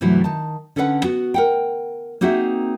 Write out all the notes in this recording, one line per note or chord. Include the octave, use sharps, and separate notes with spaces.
G2 C3 E3 F#3 A3
D#3 A5
D3 C#4 A4 B4 F5 F#5
B3 F#4
A#4 F#5 G5
A#3 C4 D#4 F#4 G#4 E5